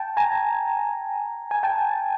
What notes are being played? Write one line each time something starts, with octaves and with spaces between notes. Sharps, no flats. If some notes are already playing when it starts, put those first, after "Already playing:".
Already playing: G5 A5
G#5 A#5
G#5
G5 A5